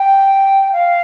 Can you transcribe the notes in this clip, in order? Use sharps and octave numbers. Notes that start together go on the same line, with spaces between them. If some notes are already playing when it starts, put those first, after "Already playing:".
Already playing: G5
F5